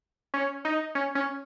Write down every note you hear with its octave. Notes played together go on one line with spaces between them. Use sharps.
C#4
D#4
C#4
C#4